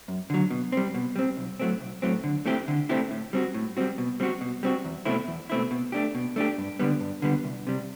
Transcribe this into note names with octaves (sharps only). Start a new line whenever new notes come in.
F#2
D3 F#3
B2
G3 C4
B2
G3 C4
B1
A2 F#3 A3 C4
B1
A2 F#3 A3 C4
D3
A3 C4 E4 G4
D3
A3 C4 E4 G4
A2
G3 C4 F#4
A2
G3 C4 F#4
B2
G3 C4 F#4
B2
G3 C4 F#4
E2
B2 A3 C4 E4
E2
B2 A3 C4 E4
B2
A3 D4 G4
B2
A3 D4 G4
G2
D3 G3 B3
G2
D3 G3 B3
C2
C3 G3